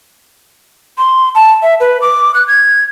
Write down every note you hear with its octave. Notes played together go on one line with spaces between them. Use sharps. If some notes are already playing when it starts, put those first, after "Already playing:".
C6
A5
E5
B4
D6
F#6
G#6